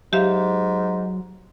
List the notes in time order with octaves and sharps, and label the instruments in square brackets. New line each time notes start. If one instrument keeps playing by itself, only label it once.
[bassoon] G#2 [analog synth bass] F#3 [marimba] G4 E5 F5